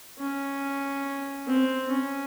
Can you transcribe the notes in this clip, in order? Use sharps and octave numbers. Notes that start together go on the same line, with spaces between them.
C#4
C4
C#4